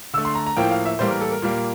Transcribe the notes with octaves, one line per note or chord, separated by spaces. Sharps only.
D3 A3 E6
C6
A#5
A#5
A2 F3 A#3 G5
F5
E5
A2 E3 G3 A#3 C5
A#4
A4
A#4
A#2 G3 A#3